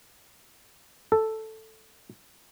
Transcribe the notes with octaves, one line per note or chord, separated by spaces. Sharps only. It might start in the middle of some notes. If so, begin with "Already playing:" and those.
A4